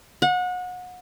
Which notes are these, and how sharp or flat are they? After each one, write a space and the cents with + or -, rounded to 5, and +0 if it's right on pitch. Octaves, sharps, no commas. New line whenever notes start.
F#5 -30